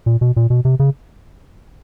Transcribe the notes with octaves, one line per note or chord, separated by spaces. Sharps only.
A#2
B2
A#2
B2
C3
C#3